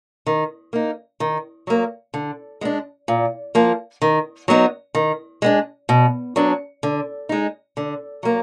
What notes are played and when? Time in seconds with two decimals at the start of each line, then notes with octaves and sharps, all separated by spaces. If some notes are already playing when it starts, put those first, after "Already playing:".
0.26 D#3
0.73 A#3 D#4
1.20 D#3
1.67 F#3 A#3
2.14 D3
2.61 G#3 B3
2.65 D4
3.08 A#2
3.55 F3 A#3
4.02 D#3
4.48 F#3 B3 D#4
4.95 D#3
5.42 G#3 B3 D4
5.89 B2
6.36 F#3 B3 D4
6.83 D3
7.29 G#3 D#4
7.77 D3
8.23 F#3 A#3